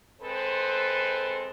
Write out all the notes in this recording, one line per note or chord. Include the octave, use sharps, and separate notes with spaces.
G#3 C4 A4 B4 C5